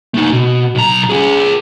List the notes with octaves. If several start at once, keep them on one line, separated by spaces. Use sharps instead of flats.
A3 D#4
B2
B1 A#5
F4 G#4